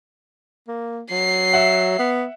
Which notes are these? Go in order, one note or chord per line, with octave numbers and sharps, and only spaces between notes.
A#3
F#3 C7
E5 F#5
B3